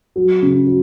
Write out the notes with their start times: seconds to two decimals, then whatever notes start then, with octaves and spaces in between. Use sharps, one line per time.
0.16 F#3
0.42 C#3
0.67 F#3